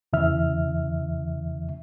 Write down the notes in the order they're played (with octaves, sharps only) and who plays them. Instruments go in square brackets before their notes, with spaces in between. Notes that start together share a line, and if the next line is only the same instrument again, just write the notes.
[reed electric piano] E2 C#3 E3 E5 F6